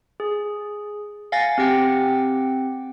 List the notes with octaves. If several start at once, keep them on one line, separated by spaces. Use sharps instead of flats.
G#4
F5 F#5 G#5 A6 A#6
C4 G4 F#5 G5